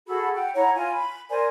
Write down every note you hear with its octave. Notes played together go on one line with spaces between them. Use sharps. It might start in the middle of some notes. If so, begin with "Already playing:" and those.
F#4 G#4 A4 B5
F#5 G5
E4 C#5 F#5 A#5
F4 G#5 A#5
B5
A#4 C5 D5 G#5